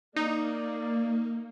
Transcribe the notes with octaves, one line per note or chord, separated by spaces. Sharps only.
A#3 D#4 D5